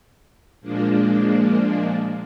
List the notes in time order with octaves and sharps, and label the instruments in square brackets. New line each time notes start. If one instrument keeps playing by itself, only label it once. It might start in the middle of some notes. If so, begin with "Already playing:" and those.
[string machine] A#2 F3 G#3 A#3 D4